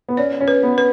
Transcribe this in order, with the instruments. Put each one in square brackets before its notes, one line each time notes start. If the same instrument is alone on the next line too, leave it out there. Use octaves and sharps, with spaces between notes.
[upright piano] B3
[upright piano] C#4 [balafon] D5
[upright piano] C#4
[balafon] B4
[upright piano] B3
[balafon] B4